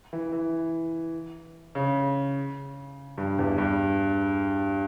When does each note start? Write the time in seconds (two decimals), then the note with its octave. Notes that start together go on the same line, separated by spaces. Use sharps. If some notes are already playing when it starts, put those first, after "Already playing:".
0.13 E3
0.32 E3
1.75 C#3
3.18 G2
3.39 E2
3.58 G2